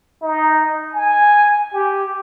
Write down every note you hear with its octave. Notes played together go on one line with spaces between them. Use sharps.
D#4
G#5
G4